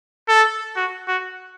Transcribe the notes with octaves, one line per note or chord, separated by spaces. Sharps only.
A4
F#4
F#4